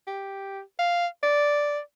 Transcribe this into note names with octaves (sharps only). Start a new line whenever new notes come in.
G4
F5
D5